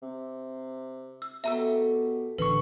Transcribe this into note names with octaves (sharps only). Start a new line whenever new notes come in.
C3
E6
B2 A3 G4 E5 A#5 C6 E6
A1 G2 D3 B4 C#6